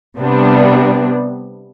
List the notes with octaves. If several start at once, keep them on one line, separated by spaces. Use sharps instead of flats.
C3 G3 B3 D4